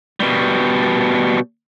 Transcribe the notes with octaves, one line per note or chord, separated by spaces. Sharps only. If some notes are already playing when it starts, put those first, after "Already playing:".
B2 G3